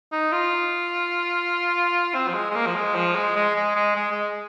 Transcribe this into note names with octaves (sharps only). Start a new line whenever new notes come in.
D#4
F4
C4
F3
G#3
G#3
A#3
F3
G#3
F3
G#3
G#3
G#3
G#3
G#3
G#3